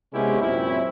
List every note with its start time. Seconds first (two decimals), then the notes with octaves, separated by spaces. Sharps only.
0.13 C3 G#3 B3 C#4 E4 G4
0.41 F#2 A#2 C4 C#4 E4